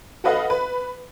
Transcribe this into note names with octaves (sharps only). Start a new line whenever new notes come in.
F#4 A4 B4 D#5 F5 F#5
B4